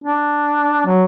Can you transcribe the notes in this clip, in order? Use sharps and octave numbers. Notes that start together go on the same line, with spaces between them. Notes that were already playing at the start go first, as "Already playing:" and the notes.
D4
F#3